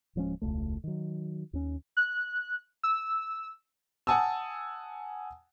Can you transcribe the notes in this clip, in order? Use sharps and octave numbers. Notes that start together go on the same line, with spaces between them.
D1 F3 G#3 C#4
E1 C#2 A3
D#3 F#3
D#2 C#4
F#6
E6
F#5 G#5 A5 D#6 E6